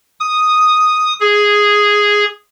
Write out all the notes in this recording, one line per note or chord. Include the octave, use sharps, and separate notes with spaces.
D#6
G#4